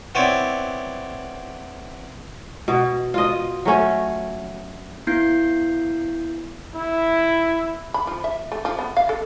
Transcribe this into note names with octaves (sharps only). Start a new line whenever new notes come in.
B3 C4 E4 C#5 D5
B2
F4 D#5
F#3 A3 C#4
B3 E4 G6 C7
E4
B5
F3
E5
A3
F3
B3
F5
A4